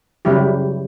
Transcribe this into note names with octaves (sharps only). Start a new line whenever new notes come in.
C#3 F#3 G3 E4 G4